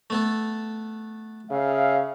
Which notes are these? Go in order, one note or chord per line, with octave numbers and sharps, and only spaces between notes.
A3 B3 A4
C#3 E5 F5